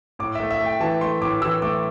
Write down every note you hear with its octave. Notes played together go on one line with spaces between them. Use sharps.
A2 D6
E5
A3
E5
A3 G5
E3 A5
A3 C6
A2 D6
E3 E6
A3 D6